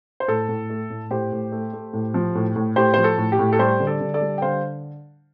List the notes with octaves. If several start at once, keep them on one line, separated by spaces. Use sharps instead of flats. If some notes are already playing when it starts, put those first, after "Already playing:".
C5
A2 A4
A2
A3
A2
A2 G4 C5
A2
A3
A3
A2
F3
A2
A2
A2 G4 C5
F3 C5
A4
A2
G4
A2
A4
G3 G4 C5
D3
A4 D5
D3
A4 D5
G3
G5
D3 C5 F5